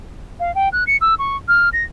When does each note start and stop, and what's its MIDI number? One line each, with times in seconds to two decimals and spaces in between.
0.40 0.54 77
0.55 0.69 79
0.73 0.84 90
0.87 0.97 97
1.01 1.14 88
1.19 1.37 85
1.48 1.69 89
1.73 1.84 94